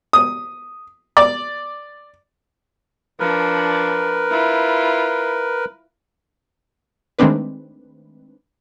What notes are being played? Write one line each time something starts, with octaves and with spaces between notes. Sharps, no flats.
D#6
D5
F3 D4 A#4 B4
E4 F4
D#3 G#3 A3 C4 D4 B4